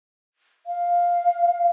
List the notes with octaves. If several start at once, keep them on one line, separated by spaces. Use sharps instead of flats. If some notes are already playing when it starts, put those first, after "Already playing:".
F5